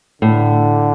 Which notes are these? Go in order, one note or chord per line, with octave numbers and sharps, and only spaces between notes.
A2 D3